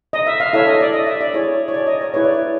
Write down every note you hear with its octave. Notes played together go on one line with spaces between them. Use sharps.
D#5
E5
F5
E4 A4 C#5 E5
D#5
D5
D#5
E5
D5
E4 G#4 C#5
C#5
D5
D#5
C#5
E4 G#4 B4 C#5
D5
C#5